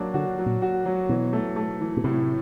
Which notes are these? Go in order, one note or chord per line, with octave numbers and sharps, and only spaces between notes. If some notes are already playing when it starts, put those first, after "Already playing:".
Already playing: F#3 A#3 D4
D3 F#4
F#3
A#2
F#4
F#3
B2 E3
A3
A3
E3
B2
A2 C3